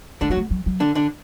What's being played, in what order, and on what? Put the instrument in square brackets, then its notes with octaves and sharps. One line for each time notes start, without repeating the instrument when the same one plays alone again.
[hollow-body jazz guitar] D3 D4 [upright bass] A3
[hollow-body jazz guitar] F#3 F#4 [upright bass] B3
[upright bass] A3
F#3
F#3
[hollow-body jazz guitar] D3 D4
D3 D4